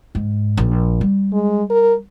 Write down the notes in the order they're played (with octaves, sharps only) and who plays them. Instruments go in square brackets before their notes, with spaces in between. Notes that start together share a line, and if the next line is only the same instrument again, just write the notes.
[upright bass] G#2
A#1
G3
[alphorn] G#3
A#4